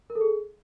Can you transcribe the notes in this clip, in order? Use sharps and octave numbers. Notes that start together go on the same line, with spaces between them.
A#4
A4
G#4